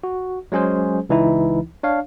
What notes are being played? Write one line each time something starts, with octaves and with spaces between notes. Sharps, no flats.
F#4
F#3 G#3 C#4 G#4 C5
C#2 E3 D#4 E4
D4 C#5 F5